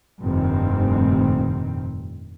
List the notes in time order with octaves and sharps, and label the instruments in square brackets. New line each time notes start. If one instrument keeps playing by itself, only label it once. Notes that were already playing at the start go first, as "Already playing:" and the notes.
[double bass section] F1 G2 A#2 D#3 C4